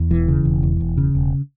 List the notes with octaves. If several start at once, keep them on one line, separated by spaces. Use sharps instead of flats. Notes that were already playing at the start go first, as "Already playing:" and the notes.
Already playing: E2
E1 E3
C#3
E1
E2
E1
C#3
E1